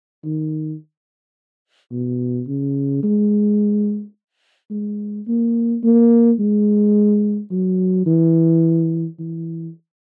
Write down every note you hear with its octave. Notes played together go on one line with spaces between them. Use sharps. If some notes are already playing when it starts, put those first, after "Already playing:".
D#3
B2
C#3
G#3
G#3
A#3
A#3
G#3
F#3
E3
E3